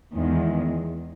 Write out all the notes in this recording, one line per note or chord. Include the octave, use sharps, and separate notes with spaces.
E2 D#3 G#3